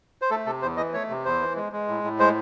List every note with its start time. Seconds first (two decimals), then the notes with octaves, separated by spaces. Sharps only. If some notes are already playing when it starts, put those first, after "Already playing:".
0.22 C5
0.31 A3 A4
0.46 C3 A4
0.62 E2 C5
0.77 E3 D#5
0.94 A3 C#5
1.09 C3
1.25 E2 C5
1.41 E3
1.56 G#3
1.72 G#3
1.88 A2
2.04 A2
2.19 G#3 C5